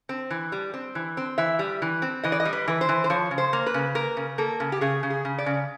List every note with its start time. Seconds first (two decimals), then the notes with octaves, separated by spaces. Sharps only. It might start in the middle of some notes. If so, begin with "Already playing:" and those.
0.09 C4
0.30 E3
0.52 G3
0.74 C4
0.95 E3
1.17 C4
1.38 E3 E5
1.59 G3
1.82 E3
2.02 C4
2.23 E3 D#5
2.32 D5
2.40 D#5
2.45 G3
2.53 B4
2.68 E3 B4
2.81 C5
2.89 E3
3.04 C5
3.10 F3 C#5
3.31 C#3
3.38 C5
3.53 A#3
3.66 B4
3.74 C#3
3.95 A#3 A#4
4.17 C#3
4.38 A#3 A4
4.60 C#3
4.72 G4
4.81 C#3 G#4
5.03 C#3
5.10 G#4
5.25 C#3
5.38 D5
5.46 C#3